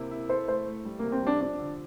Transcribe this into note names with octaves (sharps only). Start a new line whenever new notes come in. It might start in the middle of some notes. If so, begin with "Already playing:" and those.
Already playing: C3 A#3 E4
E4
A4 C5
A3 C5
A3
G3
C3 A#3
C4
G3 D4
F3 D4
D3